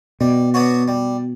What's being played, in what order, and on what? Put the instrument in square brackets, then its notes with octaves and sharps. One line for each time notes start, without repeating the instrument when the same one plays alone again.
[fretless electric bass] B2 [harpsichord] G3
[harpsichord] B3 D4 F#4 C#5
G3